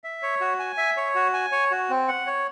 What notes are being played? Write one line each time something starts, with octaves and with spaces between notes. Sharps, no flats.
E5
C#5
F#4
G#5
E5
C#5
F#4
G#5
C#5
F#4
C4
F#5
C#5